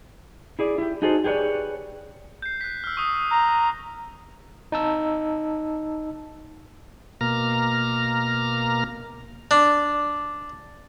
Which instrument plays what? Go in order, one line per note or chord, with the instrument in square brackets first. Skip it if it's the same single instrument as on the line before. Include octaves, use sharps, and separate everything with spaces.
[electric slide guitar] E4 G#4 D5
E4 G4
D#4 F#4 G#4 A4 C5
G4 G#4 B4 C#5 D5
[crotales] G6 C7
F#6 B6
E6 F6
C#6 D#6
[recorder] A#5 [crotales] G6
[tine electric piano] D#4 A5 E6
[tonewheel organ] B2 A#3 A#5 F6
[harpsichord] D4